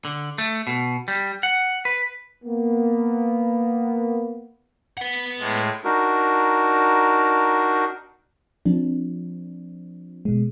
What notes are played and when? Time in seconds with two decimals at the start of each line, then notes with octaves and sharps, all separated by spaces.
0.05 D3
0.38 A3
0.67 B2
1.08 G3
1.43 F#5
1.85 B4
2.44 A#3 B3
4.98 B4 F#5
5.39 A2 G#3
5.84 D4 D#4 F#4 A#4
8.65 F3 C4 D4
10.25 B2 G#3